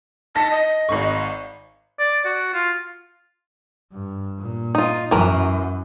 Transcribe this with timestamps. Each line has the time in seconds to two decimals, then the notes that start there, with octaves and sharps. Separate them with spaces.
0.35 D#4 A5 A#6 B6
0.51 D#5
0.89 G#1 G#2 C#6
1.99 D5
2.25 F#4
2.54 F4
3.92 G2
4.38 A#2
4.75 D#4 F4
5.11 F#2 E3 A#4 B4